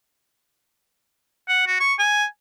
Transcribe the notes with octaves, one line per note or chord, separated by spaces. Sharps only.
F#5
F#4
C#6
G#5